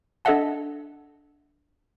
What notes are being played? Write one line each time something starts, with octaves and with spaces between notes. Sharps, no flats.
D4 A4 D#5 E5 F#5 A5